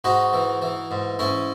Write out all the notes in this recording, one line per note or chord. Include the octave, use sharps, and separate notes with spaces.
G#2 D#4 F#4
E3
E3
G#2
G#2 C#4 E4